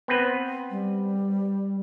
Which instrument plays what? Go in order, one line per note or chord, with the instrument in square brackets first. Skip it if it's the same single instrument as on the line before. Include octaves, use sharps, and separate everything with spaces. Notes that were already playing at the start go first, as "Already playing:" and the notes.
[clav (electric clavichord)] B3 C4 B4
[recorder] G3